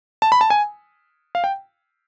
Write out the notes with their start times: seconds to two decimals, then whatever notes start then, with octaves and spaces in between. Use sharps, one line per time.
0.22 A5
0.32 B5
0.41 A5
0.50 G#5
1.35 F5
1.44 G5